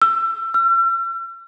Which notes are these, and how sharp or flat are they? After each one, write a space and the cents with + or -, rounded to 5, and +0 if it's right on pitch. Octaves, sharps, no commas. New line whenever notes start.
E6 +30
E6 +45